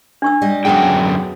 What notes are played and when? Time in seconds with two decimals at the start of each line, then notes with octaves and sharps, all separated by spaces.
0.22 D4 C#6 E6
0.41 G3 G4 D#5
0.65 F#2 D3 F#3 B3 G#4 G5